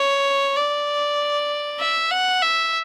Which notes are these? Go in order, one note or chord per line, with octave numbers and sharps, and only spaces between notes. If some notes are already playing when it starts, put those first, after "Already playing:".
Already playing: C#5
D5
E5
F#5
E5